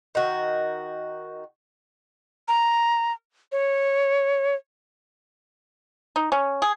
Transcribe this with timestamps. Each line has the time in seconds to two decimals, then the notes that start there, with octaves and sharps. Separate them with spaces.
0.15 D#3 F#4
2.48 A#5
3.52 C#5
6.16 D#4
6.32 C#4
6.62 G#4